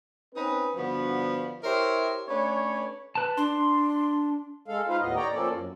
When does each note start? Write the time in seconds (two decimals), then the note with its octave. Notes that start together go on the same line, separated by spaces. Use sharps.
0.35 C4 C#4 D#4 B4
0.76 G2 D3 F3 B3 F#4
1.64 E4 G4 A#4 C5 C#5 E5
2.28 A3 C#4 D4 B4 C#5
3.15 B4 A5
3.37 D4 C6
4.68 G#3 A4 F5
4.88 D#4 F4 B4 C5 F5
5.00 D#2 A2 B3 D#5
5.16 C#5 D5 G5 A#5
5.34 F3 A#3 C4 C#4 A4 D5
5.52 F#2